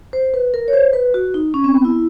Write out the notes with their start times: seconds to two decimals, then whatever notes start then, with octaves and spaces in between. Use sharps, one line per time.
0.13 C5
0.34 B4
0.54 A#4
0.68 C#5
0.73 C5
0.93 B4
1.14 F#4
1.34 D#4
1.54 C#4
1.64 C4
1.74 B3
1.84 E4